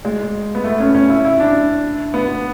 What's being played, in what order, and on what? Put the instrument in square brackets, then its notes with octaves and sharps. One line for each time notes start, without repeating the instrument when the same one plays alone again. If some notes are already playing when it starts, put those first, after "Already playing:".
[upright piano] G#3
B3
A3
C#4
C#4
E4
E4
D4
B3